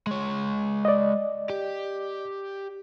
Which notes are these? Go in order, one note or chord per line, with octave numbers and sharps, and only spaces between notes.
G#3 C#5
D5 D#5
G4